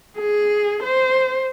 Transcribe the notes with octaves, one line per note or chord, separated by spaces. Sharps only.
G#4
C5